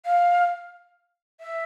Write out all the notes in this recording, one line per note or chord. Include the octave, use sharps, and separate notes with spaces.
F5
E5